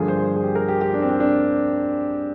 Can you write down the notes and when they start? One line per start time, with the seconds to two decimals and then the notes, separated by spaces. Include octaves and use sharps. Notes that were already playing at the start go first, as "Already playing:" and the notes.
Already playing: G2 D3 F3 A#3 G#4
0.08 C5
0.36 G#4
0.43 G4
0.55 A#4
0.68 G4
0.81 G4
0.94 D4
1.02 C4
1.09 D4
1.20 D4